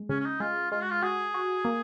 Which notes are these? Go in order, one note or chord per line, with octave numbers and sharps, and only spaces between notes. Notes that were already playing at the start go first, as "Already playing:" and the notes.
Already playing: G#3
C#3 C#4
C#4
D#4
G#3 F4
G#3 F4
F#4
F4
F#4 G#4
F#4
A#3